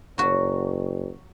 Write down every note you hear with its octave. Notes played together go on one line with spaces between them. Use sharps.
F#1 F#3 F#4